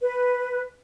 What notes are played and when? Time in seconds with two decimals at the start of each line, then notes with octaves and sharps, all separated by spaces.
0.01 B4